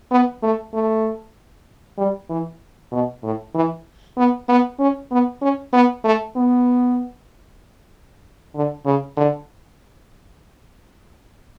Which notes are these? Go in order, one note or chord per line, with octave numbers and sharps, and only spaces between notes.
B3
A3
A3
G3
E3
B2
A2
E3
B3
B3
C#4
B3
C#4
B3
A3
B3
D3
C#3
D3